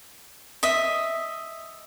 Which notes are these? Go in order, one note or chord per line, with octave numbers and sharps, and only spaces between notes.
D#5 E5